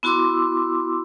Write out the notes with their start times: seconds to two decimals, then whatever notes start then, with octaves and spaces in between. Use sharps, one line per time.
0.03 B3 E4 F#4 C6 D6 E6